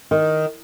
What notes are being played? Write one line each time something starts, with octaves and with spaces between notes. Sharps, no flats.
D#3